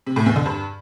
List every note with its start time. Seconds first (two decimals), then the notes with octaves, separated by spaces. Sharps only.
0.06 C3
0.16 A2
0.26 E2
0.36 D3
0.46 G2